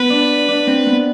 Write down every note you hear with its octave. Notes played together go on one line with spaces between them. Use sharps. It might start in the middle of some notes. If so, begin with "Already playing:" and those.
Already playing: B3 B4
D4
D4
C4
B3